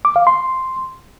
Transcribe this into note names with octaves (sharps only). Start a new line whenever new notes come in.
D6
F5
C6